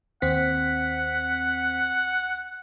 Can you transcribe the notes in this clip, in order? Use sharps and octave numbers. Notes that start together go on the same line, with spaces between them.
D#2 C4 F#5 B6